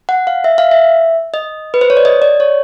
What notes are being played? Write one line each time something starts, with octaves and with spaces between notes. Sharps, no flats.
F#5
F5
E5
F5
E5
D#5
B4
C5
C#5
D5
D#5
D5
C#5